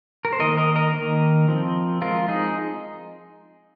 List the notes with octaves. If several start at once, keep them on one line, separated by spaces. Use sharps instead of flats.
A#4
C5
D#3 A#3 A#4 D#5
A#4 D#5
A#4 D#5
D#3 A#3
F3 C4
F3 G#3 C4 F4 A#4
D#4 G#4